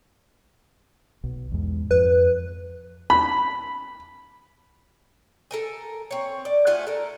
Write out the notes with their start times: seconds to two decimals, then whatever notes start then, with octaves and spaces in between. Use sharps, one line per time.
1.24 B1
1.52 E2 G#2
1.91 F2 B4
3.10 B5
5.51 A4 A#4 G#5
6.11 C4 C#5
6.45 D5
6.67 A3 F4 F#5 G#5
6.87 A4 A#4